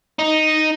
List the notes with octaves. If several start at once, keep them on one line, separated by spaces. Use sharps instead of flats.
D#4